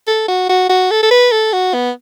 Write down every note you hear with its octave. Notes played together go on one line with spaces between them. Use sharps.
A4
F#4
F#4
F#4
A4
A4
B4
A4
F#4
B3